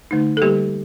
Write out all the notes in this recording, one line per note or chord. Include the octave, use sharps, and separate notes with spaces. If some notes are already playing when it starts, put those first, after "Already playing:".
D3 A3 D#4
A4
D3 G3 A#3 G4